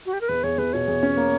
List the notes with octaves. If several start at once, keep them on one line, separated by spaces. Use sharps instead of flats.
F#4
G4
A#4
E2 B4
E2 C#5
E2 B4
B2 C#5
E2
C#4
A#3